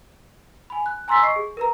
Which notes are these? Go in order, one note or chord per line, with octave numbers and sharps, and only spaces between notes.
G#5 B5
F#6
G#5 A#5 C6 E6 A6 B6
D#5 C#6 C7
G#4
A#4 B4 A#5